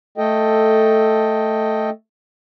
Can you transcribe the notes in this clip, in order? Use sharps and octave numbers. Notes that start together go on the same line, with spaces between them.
A3 A4 D#5 G5